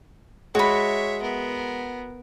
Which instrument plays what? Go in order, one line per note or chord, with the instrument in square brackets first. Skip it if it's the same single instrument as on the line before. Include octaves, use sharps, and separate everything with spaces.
[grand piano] G#3 [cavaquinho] F#4 B5 [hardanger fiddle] C#5 E5
[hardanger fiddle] B3 A#4